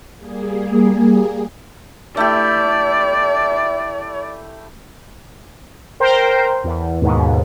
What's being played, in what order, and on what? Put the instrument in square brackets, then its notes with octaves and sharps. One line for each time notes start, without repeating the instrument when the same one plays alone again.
[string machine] G3 A#3 G#4
[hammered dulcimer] A3 E4 G4 [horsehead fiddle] D5
[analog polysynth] A#4 C5 G5
E2
D#2 G#2 B2